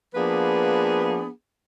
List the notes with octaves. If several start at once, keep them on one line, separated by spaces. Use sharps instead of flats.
F3 A#3 B3 D4 G#4 B4